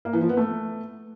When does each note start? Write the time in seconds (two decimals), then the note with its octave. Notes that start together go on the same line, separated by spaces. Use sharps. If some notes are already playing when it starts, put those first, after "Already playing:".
0.05 A#3
0.13 E3
0.21 F3
0.29 B3
0.37 A3